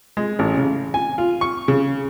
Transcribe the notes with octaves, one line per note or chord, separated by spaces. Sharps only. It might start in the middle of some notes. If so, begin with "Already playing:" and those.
G#3
A1
C#3
G#5
F4
C#6
C#3